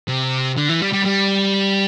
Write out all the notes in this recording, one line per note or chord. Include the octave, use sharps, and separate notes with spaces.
C3
D3
E3
G3
G3
G3